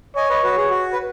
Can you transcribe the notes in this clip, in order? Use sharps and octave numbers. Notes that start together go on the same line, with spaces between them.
C#5 D#5 G#5
B4 D#5
F#4 B4
G#4
F#4
B4